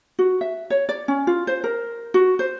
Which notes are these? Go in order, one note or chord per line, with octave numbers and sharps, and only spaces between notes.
F#4
E5
C#5
D5
C#4
F4
C5
A#4
F#4
C5